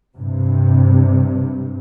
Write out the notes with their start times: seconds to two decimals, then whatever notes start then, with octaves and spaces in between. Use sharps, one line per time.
0.15 G2 C3